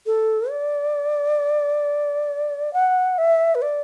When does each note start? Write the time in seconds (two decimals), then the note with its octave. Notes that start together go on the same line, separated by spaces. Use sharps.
0.06 A4
0.50 D5
2.73 F#5
3.18 E5
3.55 B4
3.63 D5